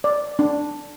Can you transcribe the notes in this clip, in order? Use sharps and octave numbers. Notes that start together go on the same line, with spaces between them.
D5
D4